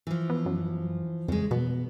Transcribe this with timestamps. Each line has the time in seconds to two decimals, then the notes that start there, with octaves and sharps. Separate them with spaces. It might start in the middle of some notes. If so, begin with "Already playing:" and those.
0.07 E3 F3
0.30 B3
0.46 F#2
1.28 F2 C#3 G#3
1.51 B2 B3